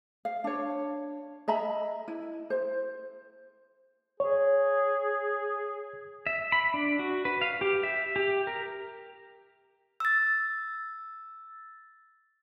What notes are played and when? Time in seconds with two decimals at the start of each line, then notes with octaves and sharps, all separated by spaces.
0.25 F5
0.44 D4 C#5
1.48 D#5 E5 A#5 B5
2.08 E4
2.50 C5
4.20 G#4 C#5
6.27 E5
6.52 B5
6.74 D4
6.99 F#4
7.25 B4
7.41 F5
7.61 G4
7.83 E5
8.16 G4
8.47 A#4
10.00 E6 A6